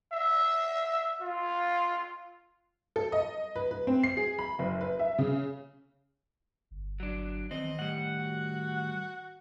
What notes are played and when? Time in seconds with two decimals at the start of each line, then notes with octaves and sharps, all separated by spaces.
0.12 E5
1.21 F4
2.96 A4
3.12 D#5
3.56 B4
3.71 B4
3.87 C4
4.03 C7
4.17 G#4
4.39 B5
4.59 F#1
4.81 B4
4.99 E5
5.18 C#3
6.71 G1
7.00 F#3 D4
7.51 E2 D#3 C4 D#5
7.79 A2 G3 F#5
8.19 F#4